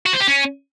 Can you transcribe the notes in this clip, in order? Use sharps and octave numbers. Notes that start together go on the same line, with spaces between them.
F#4
C5
G4
C#4